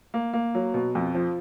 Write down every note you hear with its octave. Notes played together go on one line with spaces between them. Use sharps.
A#3
A#3
F#3
B2
F2
F3